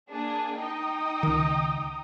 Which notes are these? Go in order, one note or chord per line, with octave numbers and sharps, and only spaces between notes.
A#3 D4 G#4
D#4 G5 D#6
C#2 D#3